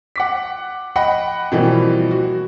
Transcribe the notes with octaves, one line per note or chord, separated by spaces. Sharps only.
F#5 D6 B6
D#5 F#5 G5 B5
B2 E3 F3 G3 A#3 C4
F#4